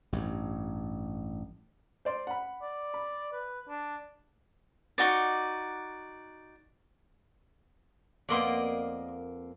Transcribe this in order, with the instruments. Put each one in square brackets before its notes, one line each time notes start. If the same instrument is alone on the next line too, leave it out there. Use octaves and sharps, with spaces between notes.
[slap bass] A1 G2
[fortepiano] C5 D5 C6
F#5 B5
[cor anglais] D5
[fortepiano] B5
[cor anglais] B4
D4
[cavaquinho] D#4 F#4 D5
[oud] F2 A#3 B3 [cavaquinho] D5 D#5 C6